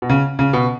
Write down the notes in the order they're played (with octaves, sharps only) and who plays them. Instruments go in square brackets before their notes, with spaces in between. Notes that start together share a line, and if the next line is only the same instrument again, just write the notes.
[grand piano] B2
C#3
C#3
B2